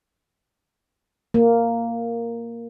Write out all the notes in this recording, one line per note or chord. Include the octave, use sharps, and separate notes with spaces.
A#3